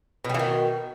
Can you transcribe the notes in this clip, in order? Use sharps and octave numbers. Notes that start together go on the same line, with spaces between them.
B2 D#3 E3 G3